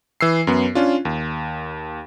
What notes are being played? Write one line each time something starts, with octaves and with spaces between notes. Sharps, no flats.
E3 E6 C7
F#2 B3
C#4 D4 F4
D#2